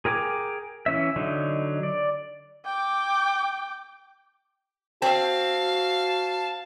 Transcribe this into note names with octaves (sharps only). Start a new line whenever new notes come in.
G#4 A#4 G5 G#5 D6
E3 C#4 E5
D3 F#3 D#4
D5
G5 D6
C4 F#4 F5 A5